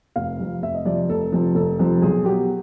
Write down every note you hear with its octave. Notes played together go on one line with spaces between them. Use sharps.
F1 F5
F2 C3 F3
F1 E5
D#5
F2 C3 F3 D5
F1 A4
F2 C3 F3
F1 A4
F2 C3 F3
B1 G#4
B2 F#3 G4